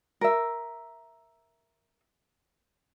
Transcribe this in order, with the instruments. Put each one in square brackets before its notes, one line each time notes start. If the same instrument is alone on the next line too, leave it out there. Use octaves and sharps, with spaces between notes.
[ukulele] A#4 E5